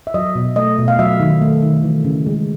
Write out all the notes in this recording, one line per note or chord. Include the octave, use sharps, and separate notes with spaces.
E5
F#3 D#5
B2
A3 D#5
B2
F5
F#3 E5
D#3
A3
D#3
E3
C#3
G#3